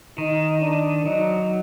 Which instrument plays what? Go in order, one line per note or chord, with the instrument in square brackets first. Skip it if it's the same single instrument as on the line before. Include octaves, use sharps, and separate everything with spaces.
[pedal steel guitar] D#3 [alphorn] D#4
[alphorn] D4
[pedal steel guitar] F#3 [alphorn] D#4